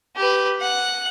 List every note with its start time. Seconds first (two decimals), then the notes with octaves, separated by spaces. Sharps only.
0.16 G4 B4
0.60 F#5 F#6